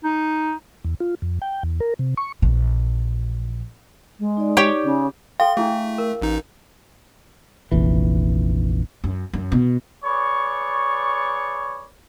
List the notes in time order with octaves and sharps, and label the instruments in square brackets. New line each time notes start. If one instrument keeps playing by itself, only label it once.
[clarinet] D#4
[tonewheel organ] E2
F4
F2
G5
E2
A#4
C3
C#6
[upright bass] A#1 E3
[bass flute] G#3
[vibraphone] D#4 D5
[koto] G4 C#5 G5
[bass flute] C#3
[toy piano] A4 G5 [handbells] F5 [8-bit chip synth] C6
[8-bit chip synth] A3 [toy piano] D4 E4 G#4
[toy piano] A#4
[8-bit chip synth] A1 D#4
[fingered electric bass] F1 A#1 E3
[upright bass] F#2
F#2
B2
[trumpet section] G#4 B4 C#5 D5 C#6